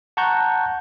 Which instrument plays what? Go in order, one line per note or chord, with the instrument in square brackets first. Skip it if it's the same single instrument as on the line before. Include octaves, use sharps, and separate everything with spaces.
[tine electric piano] F#5 A5 A#5 C#6 F#6 G6